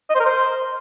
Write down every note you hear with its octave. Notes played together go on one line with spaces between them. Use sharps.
D#5
C5
A#4
C5